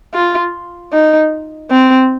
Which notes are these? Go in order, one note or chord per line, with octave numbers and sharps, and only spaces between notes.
F4
D#4
C4